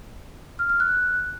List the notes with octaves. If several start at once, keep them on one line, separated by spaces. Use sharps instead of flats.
F6
F6
F#6